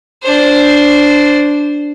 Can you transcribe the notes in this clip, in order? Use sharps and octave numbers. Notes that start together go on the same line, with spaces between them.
D4 C5